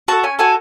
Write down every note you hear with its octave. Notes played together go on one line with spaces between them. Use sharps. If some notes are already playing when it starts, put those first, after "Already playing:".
F#4 A4 A5
C#4 G#5
F#4 A4 G#5